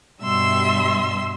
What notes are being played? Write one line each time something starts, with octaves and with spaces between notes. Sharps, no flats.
G2 B2 G3 E5 C6 E6